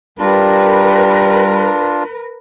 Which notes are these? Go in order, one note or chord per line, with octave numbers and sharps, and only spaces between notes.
G3 D4 F4 A#4 B4